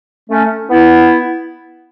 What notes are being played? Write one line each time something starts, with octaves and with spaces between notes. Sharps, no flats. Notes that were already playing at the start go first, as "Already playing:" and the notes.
A3 C#4
B3 E4